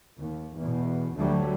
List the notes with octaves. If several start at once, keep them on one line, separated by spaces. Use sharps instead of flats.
D#2
E2 B2
D2 D3 F#3 G3 A3